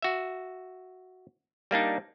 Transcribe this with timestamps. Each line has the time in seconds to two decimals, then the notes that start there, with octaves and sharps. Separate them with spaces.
0.02 F#4 E5
1.71 G3 A#3 D4 D#4